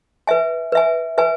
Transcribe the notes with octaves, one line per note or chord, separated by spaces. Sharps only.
B4 E5 G#5
B4 E5 G#5
B4 E5 G#5